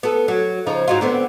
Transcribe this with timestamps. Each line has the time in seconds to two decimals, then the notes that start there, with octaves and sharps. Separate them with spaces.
0.03 B3 A4
0.28 F#3
0.66 C#3 F3 D#4
0.87 G#2 F#3 F4
1.01 D3 B3 C4